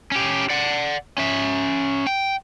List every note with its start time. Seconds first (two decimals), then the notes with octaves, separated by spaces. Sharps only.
0.12 C#4 G4
0.50 D5 F#5
1.18 C#4 E5
2.07 G5